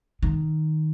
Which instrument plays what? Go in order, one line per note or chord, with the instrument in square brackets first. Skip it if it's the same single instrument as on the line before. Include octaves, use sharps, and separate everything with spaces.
[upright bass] D#3